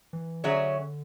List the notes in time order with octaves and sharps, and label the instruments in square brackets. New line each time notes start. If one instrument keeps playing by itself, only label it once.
[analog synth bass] E3
[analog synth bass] D3 [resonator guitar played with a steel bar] F#3 C#4 G#4 C#5 E5